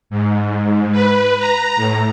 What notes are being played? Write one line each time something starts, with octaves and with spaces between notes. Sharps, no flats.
G#2
B4
A#5
A2